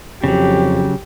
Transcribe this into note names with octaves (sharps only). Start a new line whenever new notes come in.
F2 C#3 F#3 G4